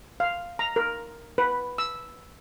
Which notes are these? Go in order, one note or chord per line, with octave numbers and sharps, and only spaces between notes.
F5
A#5
A#4
B4
E6